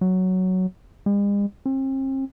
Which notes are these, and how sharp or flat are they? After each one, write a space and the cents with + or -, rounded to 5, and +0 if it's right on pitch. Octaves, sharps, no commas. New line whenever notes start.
F#3 +5
G#3 -45
C4 +40